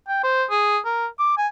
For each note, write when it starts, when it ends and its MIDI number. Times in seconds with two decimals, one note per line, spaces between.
0.08 0.22 79
0.23 0.45 72
0.50 0.78 68
0.85 1.06 70
1.19 1.36 86
1.37 1.47 80